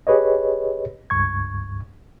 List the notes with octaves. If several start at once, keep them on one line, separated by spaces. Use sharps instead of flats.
G4 G#4 B4 C#5 D#5
C#2 G2 C#6 G#6